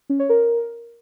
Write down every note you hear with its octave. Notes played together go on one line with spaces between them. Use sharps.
C#4
C#5
A#4